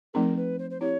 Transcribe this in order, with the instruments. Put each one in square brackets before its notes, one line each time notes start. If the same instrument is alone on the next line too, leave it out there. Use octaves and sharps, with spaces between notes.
[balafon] F3 A3 C4 D#4 G#4 [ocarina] A#4
[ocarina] B4
C5
C5
[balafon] C4 E4 G4 [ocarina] C#5